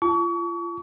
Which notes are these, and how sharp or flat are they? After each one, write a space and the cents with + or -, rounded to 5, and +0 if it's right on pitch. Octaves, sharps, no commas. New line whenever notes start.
F4 -30 A5 +0 C#6 +35